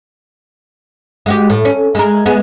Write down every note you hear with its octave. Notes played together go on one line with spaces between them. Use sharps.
G#3 F#4 G4
A2
C#4
G#3 A#4
G#3 B3 G#4